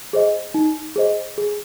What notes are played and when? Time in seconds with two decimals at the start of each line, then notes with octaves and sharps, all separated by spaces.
0.13 G#4 C5 D#5
0.54 D#4
0.96 G#4 C5 D#5
1.38 G#4